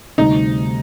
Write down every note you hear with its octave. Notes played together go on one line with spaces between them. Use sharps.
D2 C3 G3 D#4